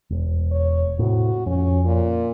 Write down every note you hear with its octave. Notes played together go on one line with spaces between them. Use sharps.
E1
C#5
A2 C3 F#4
F2 C#4
A#2